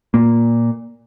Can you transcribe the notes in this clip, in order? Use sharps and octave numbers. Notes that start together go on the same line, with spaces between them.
A#2 A#3